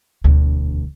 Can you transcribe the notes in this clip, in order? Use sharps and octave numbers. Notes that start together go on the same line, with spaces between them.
E1 D2